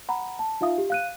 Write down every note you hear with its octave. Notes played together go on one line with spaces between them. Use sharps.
F#5 A#5 B5
A5
D#4 F4 E5 F5 D#6
G4
F5 F#6 D#7